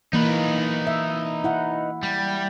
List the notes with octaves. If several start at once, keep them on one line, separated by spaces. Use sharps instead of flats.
E3 A#3 D#4 B4
E5
E4 F#5
G3